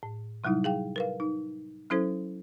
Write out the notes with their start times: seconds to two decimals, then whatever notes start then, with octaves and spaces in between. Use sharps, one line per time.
0.03 A2
0.44 C3 F#3 G3 D#4 E4
0.64 G#4 F5 G5
0.96 A#4 B4 F5
1.20 D#4
1.90 F#3 C#4 E4 A4 C5